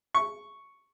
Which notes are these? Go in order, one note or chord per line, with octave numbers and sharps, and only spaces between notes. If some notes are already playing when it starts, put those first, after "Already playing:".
C#6